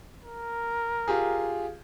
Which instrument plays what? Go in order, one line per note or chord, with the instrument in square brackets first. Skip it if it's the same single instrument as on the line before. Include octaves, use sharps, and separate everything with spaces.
[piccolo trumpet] A#4
[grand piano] F4 G4 G#4